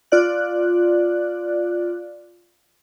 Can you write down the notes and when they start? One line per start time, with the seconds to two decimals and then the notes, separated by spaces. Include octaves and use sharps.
0.12 F4 D5 F#6